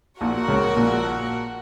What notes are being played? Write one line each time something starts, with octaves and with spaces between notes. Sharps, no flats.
A#1 A#2 F#4 A#4 F#5
C#2 C#3
A#1 A#2